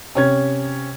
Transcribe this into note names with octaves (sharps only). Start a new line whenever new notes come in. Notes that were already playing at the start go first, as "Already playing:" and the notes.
C3 C#4 G#6